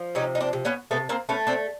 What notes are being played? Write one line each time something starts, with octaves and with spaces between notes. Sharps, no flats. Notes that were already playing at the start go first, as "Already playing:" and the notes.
Already playing: F3
C3 C#4 D#4
D#4
C4 D4
C3
B3 C#4
C3 A3 B3
A#3 C4
A3 B3 C#4
C4 D4